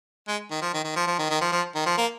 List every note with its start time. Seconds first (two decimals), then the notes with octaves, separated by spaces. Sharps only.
0.28 G#3
0.50 D#3
0.62 F3
0.73 D#3
0.84 D#3
0.96 F3
1.07 F3
1.18 D#3
1.30 D#3
1.41 F3
1.52 F3
1.75 D#3
1.86 F3
1.97 A#3